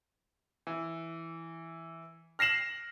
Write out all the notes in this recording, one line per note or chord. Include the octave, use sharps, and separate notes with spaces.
E3
F6 A#6 C7 E7 F#7